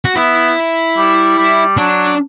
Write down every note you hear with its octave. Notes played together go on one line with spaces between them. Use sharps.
F#4
B3 E4
G3
G3
F#3 D4